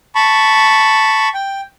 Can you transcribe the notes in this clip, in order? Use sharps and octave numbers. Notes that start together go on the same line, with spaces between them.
A5 B5 C#6
G5